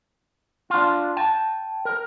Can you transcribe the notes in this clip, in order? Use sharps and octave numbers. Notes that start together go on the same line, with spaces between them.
D4 F4
G5 A5
A#4